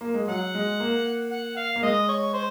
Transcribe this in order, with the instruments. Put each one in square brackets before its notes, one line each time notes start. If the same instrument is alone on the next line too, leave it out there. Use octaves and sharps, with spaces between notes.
[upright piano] A#3
G#3
[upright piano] F#3 [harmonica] F#5
[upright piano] G#3
A#3
[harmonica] F#5
F5
[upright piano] A#3
[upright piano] G#3 [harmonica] D#5
[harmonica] C#5
C5